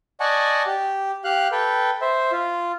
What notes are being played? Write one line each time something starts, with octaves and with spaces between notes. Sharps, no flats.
D5 D#5 F#5 G#5 A5 C#6
G4
G4 F5 F#6
A4 B4 G5
C5 E5
F4